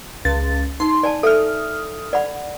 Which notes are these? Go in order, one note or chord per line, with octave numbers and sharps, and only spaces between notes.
C#2 A6
D#4 C6
D5 G#5 A5
A4 E5 D#6 F6
D5 F#5 B5